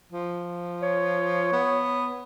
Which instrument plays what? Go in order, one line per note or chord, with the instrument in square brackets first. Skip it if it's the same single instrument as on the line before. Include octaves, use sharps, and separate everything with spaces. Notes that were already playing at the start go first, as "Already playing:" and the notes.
[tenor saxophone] F3
[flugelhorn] C#5
[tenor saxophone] B3